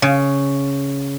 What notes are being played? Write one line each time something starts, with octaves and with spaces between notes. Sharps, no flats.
C#3